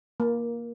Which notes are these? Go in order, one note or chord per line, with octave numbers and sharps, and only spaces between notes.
A#3